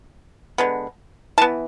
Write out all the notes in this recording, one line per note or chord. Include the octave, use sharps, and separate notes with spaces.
D3 G#3 B3
E3 B3 A5